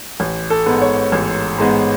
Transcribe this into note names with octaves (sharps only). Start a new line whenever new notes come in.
A1
A4
G#2 G#3 B3
C#5
A1
G#2 G#3 B3